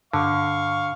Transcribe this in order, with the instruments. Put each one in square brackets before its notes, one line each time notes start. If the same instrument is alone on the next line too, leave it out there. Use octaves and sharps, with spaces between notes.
[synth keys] G2 [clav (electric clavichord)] D3 [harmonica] F5 C#6